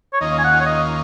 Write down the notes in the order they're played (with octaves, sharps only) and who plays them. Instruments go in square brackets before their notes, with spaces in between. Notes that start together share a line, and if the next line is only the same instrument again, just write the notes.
[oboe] C#5
[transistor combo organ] D#2 D#3 A#3 C#4 F4 [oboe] D#5
[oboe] G#5
F#5
C#5
D#5